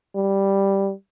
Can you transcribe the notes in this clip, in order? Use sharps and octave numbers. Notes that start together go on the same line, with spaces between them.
G3